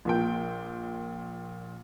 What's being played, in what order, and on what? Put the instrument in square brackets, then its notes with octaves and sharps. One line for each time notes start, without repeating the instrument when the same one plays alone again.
[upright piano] A#1 A#2 G5